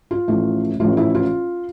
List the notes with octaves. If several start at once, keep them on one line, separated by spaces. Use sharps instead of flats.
F4
A1 A2 F3 A3
A1 A2 F3 A3 F4
E4
F4